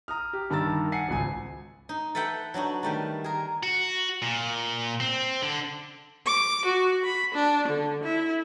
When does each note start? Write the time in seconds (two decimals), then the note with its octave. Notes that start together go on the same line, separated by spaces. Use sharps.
0.08 A#5 D#6 F6
0.33 G4
0.50 G2 D#3 A5 A#5 E6 A6
0.92 F#5 G#5 C7 C#7
1.08 G#1 C#2 G#5
1.89 D#4
2.15 A4 B4 E5 F#5 G5
2.54 F#3 D4 D#4 F#4
2.83 D#3 G3 A3
3.24 G#4 A#4
3.63 F#4
4.22 A#2
5.00 C4
5.42 D3
6.27 D6
6.65 F#4
7.05 B5
7.35 D4
7.68 D3
8.03 E4